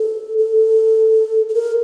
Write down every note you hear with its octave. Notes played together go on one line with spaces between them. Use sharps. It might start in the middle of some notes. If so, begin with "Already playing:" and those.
Already playing: A4
A4
A4
A#4